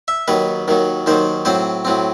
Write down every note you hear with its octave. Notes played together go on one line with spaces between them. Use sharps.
E5
D#2 D#3 F#3 B4
D#2 D#3 F#3
D#2 D#3 F#3 C5
A2 F#3 C4 C5
A2 F#3 C4